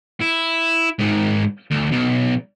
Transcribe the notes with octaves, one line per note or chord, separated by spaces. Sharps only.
E4
G#2 D#3
D2
B1